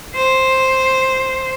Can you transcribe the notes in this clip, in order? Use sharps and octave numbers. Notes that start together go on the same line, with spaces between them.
C5